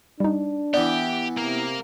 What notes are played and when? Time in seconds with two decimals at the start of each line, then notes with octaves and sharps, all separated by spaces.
0.20 G3 D4 D#4
0.74 E3 B3 G4 D5
1.37 C3 A#3 A#4